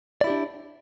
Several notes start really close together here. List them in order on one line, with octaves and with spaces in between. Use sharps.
D5 E4 G4 D4